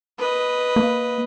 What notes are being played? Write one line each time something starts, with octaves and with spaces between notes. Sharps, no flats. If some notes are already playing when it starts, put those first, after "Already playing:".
B4 D#5
A#3